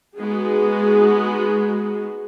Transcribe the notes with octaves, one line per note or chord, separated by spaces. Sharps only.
G#3 B3 D#4 F#4 G#4